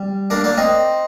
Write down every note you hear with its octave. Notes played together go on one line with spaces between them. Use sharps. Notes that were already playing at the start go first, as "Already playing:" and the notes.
Already playing: G3
A#3 D4
A#3 D4
C4 D#4